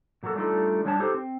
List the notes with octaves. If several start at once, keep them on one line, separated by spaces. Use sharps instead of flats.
A#2 F#3 A#3 F#4 A4
G3 A3 D4 D#4 F4 A4
F#3 G3 D4 C#5 F#5 A5
D#4 G4 A4 C5
C4